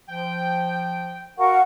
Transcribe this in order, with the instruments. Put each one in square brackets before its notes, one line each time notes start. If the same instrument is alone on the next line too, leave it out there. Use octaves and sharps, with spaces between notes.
[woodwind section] F3 G5
[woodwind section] F#4 A#4 [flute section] F5 F#5 C#6